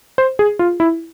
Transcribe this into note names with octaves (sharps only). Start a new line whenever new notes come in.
C5
G#4
F4
E4